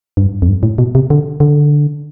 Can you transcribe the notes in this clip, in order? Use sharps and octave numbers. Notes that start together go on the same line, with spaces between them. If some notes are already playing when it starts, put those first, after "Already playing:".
G2
F2
G2
A2
B2
C3
D3
D3